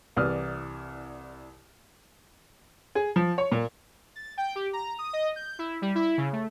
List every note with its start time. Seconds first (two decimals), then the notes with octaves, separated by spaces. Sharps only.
0.17 C2 E3 D5 D#6 F6
2.95 G#4
3.16 F3
3.38 C#5
3.52 A#2
4.16 A6
4.37 G5
4.55 G4
4.73 A#5
4.99 D#6
5.13 D#5
5.36 G6
5.59 E4
5.82 G3
5.95 E4
6.18 C#3
6.33 A3